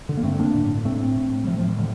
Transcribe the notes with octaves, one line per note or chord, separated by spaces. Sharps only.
D3
A#3
G2 A3 C4
D3 A#3 D4
A2
A2 A3 C4
A2
G3
A2 F3 A3
F3 A3
D#3 G3
A2 D3 F3